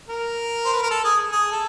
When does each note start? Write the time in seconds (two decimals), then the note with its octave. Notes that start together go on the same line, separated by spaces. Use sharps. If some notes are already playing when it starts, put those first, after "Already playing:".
0.08 A#4
0.65 C5
0.73 B4
0.82 A#4
0.90 A4
1.04 G#4
1.32 G#4
1.52 A4